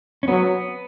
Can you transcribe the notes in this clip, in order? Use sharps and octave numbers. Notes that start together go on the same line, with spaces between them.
C#4
F#3 B3